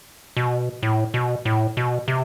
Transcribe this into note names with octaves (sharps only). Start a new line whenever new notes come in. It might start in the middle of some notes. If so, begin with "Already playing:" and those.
B2
A2
B2
A2
B2
C3